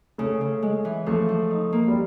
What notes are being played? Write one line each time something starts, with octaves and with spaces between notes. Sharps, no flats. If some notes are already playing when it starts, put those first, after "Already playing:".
C#3 A3
C#3
G#3
E3
F3 A3
F3
D#4
A#3
G3